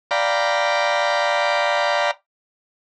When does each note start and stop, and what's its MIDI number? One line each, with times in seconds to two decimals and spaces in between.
0.11 2.11 74
0.11 2.11 77
0.11 2.11 79
0.11 2.11 82
0.11 2.11 83